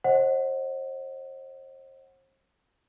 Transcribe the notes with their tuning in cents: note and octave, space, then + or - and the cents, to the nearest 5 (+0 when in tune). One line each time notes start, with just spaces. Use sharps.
C5 +35 D#5 -10 F#5 +0